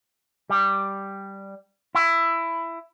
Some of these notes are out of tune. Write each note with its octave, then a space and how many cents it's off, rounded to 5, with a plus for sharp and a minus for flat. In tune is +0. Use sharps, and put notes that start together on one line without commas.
G3 +0
E4 +15